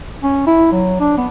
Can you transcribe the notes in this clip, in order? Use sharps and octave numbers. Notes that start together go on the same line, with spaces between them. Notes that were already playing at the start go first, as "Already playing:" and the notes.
C#4
E4
F#3
D4
B3